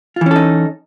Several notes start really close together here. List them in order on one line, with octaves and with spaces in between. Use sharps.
F4 E3 C#4 A4 D#4